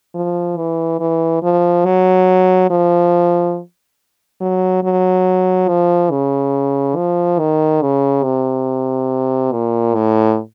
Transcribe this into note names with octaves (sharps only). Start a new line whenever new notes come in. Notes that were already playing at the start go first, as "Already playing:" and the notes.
F3
E3
E3
F3
F#3
F3
F#3
F#3
F3
C#3
F3
D#3
C#3
C3
A#2
A2